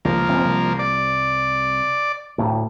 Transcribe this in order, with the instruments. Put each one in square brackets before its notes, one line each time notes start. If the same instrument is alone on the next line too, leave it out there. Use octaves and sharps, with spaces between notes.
[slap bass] C#2 [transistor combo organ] F3 A#3
[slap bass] F#1 C#2 C4
C2
[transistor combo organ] D5
[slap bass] D2 A2